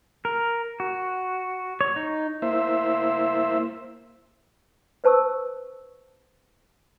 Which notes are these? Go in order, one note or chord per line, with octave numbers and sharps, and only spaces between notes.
A#4
F#4
C#5
D#4
A#3 E4 C5 E5
B4 C5 A5 C#6 E6